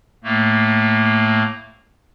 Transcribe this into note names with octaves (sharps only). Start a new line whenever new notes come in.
A2 A3 A#3